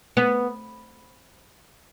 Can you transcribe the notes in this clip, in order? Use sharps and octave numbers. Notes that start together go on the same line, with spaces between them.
B3